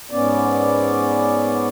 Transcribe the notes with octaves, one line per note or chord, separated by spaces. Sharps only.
G#2 B3 C#4 D5